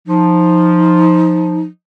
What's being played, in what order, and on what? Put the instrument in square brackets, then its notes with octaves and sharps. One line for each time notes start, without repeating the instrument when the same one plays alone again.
[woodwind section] F3 [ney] D#4